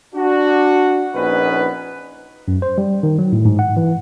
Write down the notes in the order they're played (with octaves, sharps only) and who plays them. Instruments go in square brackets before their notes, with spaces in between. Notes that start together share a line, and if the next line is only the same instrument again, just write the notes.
[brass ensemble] D4 F#4
A#1 A#2 B3 C#4 D#4 B4
[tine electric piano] F#2
C5
G3
D#3
F#3
A2
G#2
F#5
E3